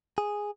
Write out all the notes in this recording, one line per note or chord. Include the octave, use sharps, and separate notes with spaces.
G#4